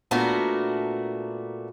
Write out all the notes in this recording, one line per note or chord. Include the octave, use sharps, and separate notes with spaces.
A#2 A3 B3 D4 F#4 A#4